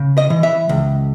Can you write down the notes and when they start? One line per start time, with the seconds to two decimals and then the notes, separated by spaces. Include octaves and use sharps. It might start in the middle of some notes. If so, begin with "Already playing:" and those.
Already playing: C#3
0.18 D#5
0.30 E3
0.43 E5
0.69 C#2